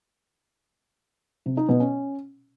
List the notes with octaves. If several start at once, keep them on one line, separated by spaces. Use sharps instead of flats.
C3
D#4
B2
C#4